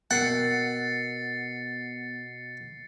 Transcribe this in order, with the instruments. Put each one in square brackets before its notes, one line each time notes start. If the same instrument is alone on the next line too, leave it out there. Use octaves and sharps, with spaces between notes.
[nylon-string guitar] B2 A#4 G5 [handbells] B3 [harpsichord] F#5 [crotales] A6 C7 C#7